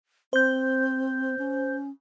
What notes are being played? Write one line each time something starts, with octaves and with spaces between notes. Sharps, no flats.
C4 C5 G6
C#4